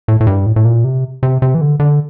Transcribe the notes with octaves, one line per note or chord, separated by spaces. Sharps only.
A2
A2
G2
A2
A2
A#2
C3
C3
C3
E3
D3
D3